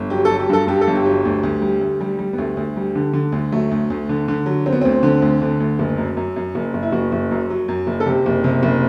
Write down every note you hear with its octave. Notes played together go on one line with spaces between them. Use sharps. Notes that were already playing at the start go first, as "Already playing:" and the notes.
Already playing: G1
F#3 G4
F#3 A4
G4
G2 A4
G2 G4
A4
G1
G4
F#3
D2
D2
G3
D2
G3
G3
B3
D2 A3
D2
G3
D3
D3
D2
F#3 A3
D2
D2
D3
D3
F#3
F#3 C4
B3
D2 C4
D3
D2
D3
D2
F#1
F#2
F#2
F#2
F#1
F#1
E4
F#1 F#4
F#1
F#2
F#3
F#2
F#1
A4
C3 G4
F#1
C3
F#1